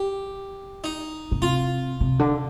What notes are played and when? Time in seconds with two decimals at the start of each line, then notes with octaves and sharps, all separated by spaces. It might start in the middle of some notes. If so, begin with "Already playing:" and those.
Already playing: G4
0.84 D#4
1.31 B2
1.41 C3 F4
2.00 C3
2.19 D3